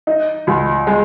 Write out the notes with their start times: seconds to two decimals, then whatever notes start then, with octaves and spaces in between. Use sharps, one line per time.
0.07 D#4
0.47 C#2
0.87 G#3